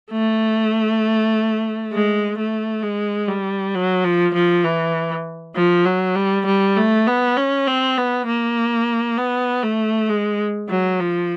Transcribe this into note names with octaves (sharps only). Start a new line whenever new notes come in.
A3
G#3
A3
G#3
G3
F#3
F3
F3
E3
F3
F#3
G3
G3
A3
B3
C#4
C4
B3
A#3
B3
A3
G#3
F#3
F3